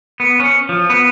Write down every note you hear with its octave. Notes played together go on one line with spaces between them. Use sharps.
B3
C#4
F3
B3